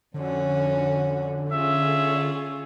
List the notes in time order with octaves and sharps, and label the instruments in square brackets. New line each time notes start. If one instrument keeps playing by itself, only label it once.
[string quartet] F2 C#4 F#4 [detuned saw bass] D3
[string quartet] C#4 F4 G#4 [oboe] E5